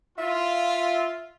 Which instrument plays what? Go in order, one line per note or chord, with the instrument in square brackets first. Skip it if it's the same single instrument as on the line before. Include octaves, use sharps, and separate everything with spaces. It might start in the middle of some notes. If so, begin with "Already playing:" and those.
[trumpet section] F4 [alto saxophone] E5